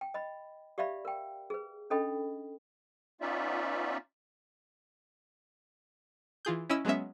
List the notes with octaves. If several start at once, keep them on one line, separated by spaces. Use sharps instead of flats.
G5
D#5 B5
G4 D5 E5 F5 B5
A#4 G5
G#4 B4
C#4 D4 A4 D#5 G5 B5
B3 C#4 D#4 F4 D5 E5
E3 F4 G#4 G6
C#4 E4 D#5 E6 D#7
F#3 G#3 B3 C#4 E5